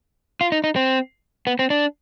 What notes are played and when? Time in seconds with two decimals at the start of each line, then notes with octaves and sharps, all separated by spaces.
0.41 F4
0.52 D#4
0.64 D#4
0.76 C4
1.47 B3
1.59 C4
1.70 D4